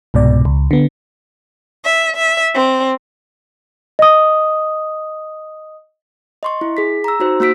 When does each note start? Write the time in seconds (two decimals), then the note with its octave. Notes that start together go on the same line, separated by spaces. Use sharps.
0.14 C2 G#2 B2 D5
0.45 C#2
0.71 D3 B3
1.85 E5
2.16 E5
2.53 C4
3.99 D#5 D#6
6.43 D#5 C6 C#6
6.61 E4
6.77 G#4 B6
7.04 A#5 E6
7.20 D#4 F#4 C5
7.40 A#3 F#4 E6 B6 D7